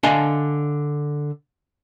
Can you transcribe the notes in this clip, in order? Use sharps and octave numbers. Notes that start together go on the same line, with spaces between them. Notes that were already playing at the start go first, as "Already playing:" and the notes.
D3 D4 D#5 F5 G#5 A5